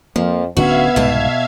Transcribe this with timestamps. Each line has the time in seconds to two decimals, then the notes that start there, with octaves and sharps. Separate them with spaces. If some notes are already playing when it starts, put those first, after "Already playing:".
0.16 F2 F3 A#3
0.57 D1 D3 B3 C#4 F#4 E5 F5 G#6
0.96 C2 G#2 B2 A5